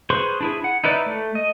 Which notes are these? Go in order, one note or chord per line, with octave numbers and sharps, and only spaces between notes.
G#4 B4 C5 C6 C#6
D4 E4 G#4
F#5
D#4 E4 B4 D5
A3
D#5